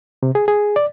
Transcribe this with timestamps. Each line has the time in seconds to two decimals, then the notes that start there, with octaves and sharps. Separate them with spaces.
0.23 C3
0.35 G#4
0.48 G#4
0.76 D5